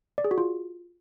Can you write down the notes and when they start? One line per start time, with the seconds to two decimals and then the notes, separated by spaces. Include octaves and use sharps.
0.18 D5
0.24 G#4
0.31 F#4
0.38 F4